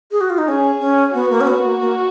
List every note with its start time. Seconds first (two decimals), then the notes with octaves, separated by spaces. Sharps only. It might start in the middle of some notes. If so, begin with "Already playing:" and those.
0.12 G#4
0.21 F#4
0.30 F4
0.38 D#4
0.48 C#4 G#4
0.80 C#4
1.14 B3 F#4
1.30 A#3
1.41 C#4
1.47 B3
1.64 A#3
1.80 A#3